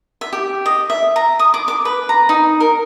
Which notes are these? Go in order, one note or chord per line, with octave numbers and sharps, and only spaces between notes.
E5
G4
D#5
E5
A#5
D#6
D6
D6
B4
A#5
D#4
A#4